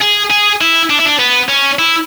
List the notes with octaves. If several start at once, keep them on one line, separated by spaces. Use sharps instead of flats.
G#4
G#4
E4
D4
E4
D4
B3
C#4
E4